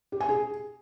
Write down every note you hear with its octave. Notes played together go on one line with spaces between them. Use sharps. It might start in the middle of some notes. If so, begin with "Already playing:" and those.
G4
G#5
G#4